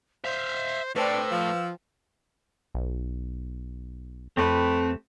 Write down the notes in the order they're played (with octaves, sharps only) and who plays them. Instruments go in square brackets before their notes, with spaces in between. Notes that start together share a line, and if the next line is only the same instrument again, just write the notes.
[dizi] C5 [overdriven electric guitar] E5 F5
[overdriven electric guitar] A2 [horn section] C4 D4 [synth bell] B4 C5 G5 [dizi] E6
[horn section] F3
[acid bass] B1
[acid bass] F2 [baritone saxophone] A3 [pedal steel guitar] C4 G4 B4